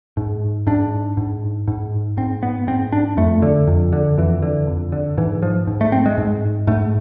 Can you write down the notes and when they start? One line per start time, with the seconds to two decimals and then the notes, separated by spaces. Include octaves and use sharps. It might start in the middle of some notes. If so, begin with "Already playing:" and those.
0.17 G#2
0.67 G#2 D4
1.17 G#2
1.68 G#2
2.17 G#2 C4
2.43 B3
2.67 G#2 C4
2.92 D4
3.17 F2 A3
3.42 D3
3.68 F2
3.93 D3
4.18 F2 E3
4.42 D3
4.67 F2
4.92 D3
5.18 G#2 E3
5.42 F3
5.67 G#2
5.81 A3
5.92 C4
6.06 G#3
6.18 G#2
6.67 G#2 A3